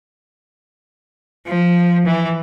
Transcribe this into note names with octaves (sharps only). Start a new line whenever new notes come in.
F3
E3